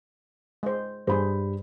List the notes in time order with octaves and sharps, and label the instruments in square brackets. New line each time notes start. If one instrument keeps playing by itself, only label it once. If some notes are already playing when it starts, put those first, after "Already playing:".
[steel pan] G#3 C5
[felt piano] G2 B5 [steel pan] G#4 C5